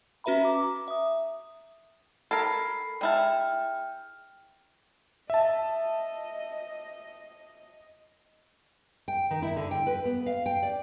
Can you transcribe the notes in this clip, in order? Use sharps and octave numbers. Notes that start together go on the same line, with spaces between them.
C#4 F#4 B4 E5 A#5 B5
A#5 D6
E5 D#6
A4 A#4 B5 G#6 C7
G#3 E4 G5 A5 F6
D#5 E5 A5
G5
D#3
E4
D3
G5
B4
B3
F5
G5
D5